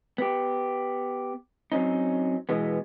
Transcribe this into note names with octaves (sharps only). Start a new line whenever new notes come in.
B3 G4
F#3 C4 C#4 D#4
B2 E3 G#3 B3